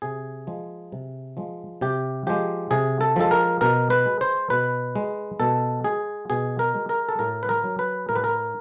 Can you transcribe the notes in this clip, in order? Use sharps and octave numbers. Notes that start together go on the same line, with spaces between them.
C3 G#4
F3 G#3
C3
F3 G#3
C3 G4
F3 G#3 G4
C3 G#4
A4
F3 G#3 A4
A#4
B2 A#4
B4
G#3
C5
B2 B4
G#3
B2 A4
G#3 G#4
B2 G#4
A#4
G#3
A#4
A4
A2 A#4
B4
A#4
F#3
B4
A2 A#4
B4
A#4